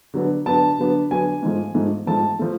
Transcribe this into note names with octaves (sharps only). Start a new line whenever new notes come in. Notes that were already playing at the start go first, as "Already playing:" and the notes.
D3 F#3 B3 D4
D3 F#3 B3 D4 A5
D3 F#3 B3 D4
D3 F#3 B3 D4 G#5
G#2 F3 A3
G#2 F3 A3
G#2 F3 A3 A5
F3 A3